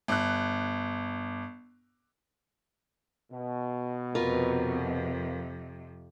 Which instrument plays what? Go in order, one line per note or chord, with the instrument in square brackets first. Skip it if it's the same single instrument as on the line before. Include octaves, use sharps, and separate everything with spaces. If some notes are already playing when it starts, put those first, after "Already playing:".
[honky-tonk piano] G1 F#6
[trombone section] B2
[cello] F2 C3 [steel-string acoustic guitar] F4 A#4 B4